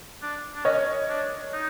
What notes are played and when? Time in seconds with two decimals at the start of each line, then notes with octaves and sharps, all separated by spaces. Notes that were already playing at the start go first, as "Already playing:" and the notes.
0.22 D4
0.55 D4
0.65 C#4 C#5 D#5
1.09 D4
1.53 D#4